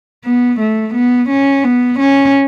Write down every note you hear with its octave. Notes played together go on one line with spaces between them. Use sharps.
B3
A3
B3
C#4
B3
C#4